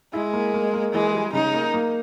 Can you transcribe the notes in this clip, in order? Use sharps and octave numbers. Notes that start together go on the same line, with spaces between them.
G#3 E4
A#3
A#3
A#3
E3 G#3
G3
C#3 D#4
A#3
A#3